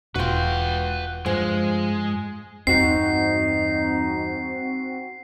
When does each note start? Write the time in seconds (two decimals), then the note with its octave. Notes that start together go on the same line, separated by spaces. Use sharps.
0.16 E1 F4 F#4 B4 G5
1.26 G2 F3 G#3
2.67 E2 G2 C4 D#4 F#4 C7